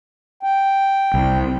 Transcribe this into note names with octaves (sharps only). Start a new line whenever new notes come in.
G5
C2